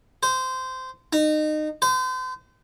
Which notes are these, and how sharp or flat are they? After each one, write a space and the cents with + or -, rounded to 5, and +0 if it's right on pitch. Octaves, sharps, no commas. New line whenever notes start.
C5 -15
D#4 -25
C5 -35